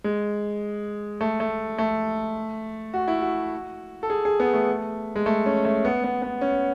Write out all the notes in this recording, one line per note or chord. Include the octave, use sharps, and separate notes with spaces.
G#3
A3
A3
A3
F#4
E4
F#4
A4
G#4
G#4
B3
A3
G#3
A3
C#4
A3
B3
B3
B3
C#4